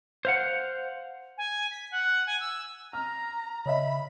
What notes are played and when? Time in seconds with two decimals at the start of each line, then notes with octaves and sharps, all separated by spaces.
0.25 C5 F5 F#5
1.37 G#5
1.71 B6
1.91 F#5
2.26 G#5
2.40 E6
2.93 A#5 F6
3.66 C#3 C#5 D#5 E5 B5